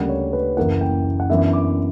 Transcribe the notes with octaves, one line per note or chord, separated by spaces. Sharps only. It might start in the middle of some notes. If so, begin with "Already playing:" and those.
Already playing: D2 C#3 G3 A#3 D4 F#5
C#5
B4
F#1 F#2 E3 A#3 E4 F#5
G5
F#5
F#2 E3 B3 D4 E5
D6